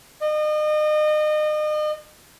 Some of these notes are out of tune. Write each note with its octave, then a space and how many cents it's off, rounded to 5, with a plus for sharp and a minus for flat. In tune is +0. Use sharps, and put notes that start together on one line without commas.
D#5 -35